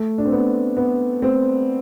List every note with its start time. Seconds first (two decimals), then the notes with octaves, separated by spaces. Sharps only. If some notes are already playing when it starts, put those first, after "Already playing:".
Already playing: A3
0.18 D4
0.25 C4
0.32 B3
0.77 B3
1.22 C4